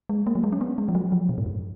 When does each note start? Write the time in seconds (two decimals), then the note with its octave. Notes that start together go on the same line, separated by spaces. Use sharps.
0.09 G#3
0.27 A#3
0.35 F#3
0.44 G#3
0.52 C#4
0.61 B3
0.78 G#3
0.89 F3
0.95 F#3
1.12 F3
1.29 B2
1.38 G#2
1.46 F#2